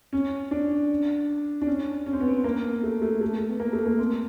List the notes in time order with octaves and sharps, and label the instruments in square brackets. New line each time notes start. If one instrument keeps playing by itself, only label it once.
[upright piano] C#4
D4
D4
C#4
C#4
C4
B3
C4
A#3
A3
A3
A3
B3
A#3
A3
A#3
C4